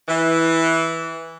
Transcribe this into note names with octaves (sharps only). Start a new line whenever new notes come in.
E3